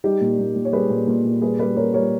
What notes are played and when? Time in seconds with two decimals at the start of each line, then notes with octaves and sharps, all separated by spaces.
0.04 G3 D#4 G4
0.21 A#2
0.39 A#2
0.56 A#2
0.65 C#5
0.73 G3 G#4 B4
0.90 A#2
1.08 A#2
1.25 A#2
1.42 G3 G#4 B4
1.59 G3 G#4 B4
1.76 A#2 A#4 C#5
1.94 G3 A#4 C#5